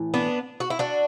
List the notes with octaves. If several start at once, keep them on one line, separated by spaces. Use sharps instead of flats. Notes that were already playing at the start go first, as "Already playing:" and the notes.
Already playing: A2 E3
B3 D4
F#4
E4
D4 F#4